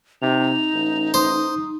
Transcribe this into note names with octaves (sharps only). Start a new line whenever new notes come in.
C3 D#4 F7
A1
C5 D#6